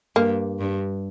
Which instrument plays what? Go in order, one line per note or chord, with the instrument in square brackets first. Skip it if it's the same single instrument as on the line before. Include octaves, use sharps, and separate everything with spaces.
[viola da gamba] G2 [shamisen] A#3
[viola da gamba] G2